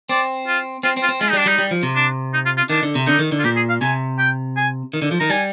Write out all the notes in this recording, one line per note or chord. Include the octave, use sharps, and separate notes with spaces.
C4 D5
F4
C4 F4
C4
F4
C4
G#3 F4
G3 D#4
D4
G3 D#4
G3
F3
C3
D4
D#4
F4
F4
D#3 D4
D3
C3
D3 D#4
D#3
D3
F4
A#2 G4
G#4
F5
C3 G#5
G5
G#5
D#3
D3
F3
D#3 A#5
G3 G#5